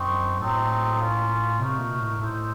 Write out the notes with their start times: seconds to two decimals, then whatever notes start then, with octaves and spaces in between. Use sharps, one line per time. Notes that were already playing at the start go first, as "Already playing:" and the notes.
Already playing: F#2 C4 D#4 F#4
0.40 A2 F#3 C4 D#4 A4
1.00 A#3 C#4 F4
1.59 C3 A3 D#4 F#4 A#4
1.79 A#2
1.99 A2
2.19 A2 D#4 A4 C5